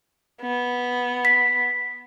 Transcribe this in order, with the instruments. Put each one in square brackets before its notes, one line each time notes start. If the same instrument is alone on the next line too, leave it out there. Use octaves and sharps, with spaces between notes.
[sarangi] B3
[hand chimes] B6